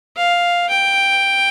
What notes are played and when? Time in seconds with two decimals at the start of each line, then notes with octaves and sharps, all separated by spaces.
0.17 F5
0.69 G5